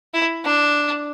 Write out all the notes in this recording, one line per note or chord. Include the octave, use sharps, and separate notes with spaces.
E4
D4